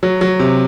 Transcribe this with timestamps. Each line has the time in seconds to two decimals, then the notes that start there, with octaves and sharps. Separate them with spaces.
0.03 F#3
0.21 F#3
0.39 C3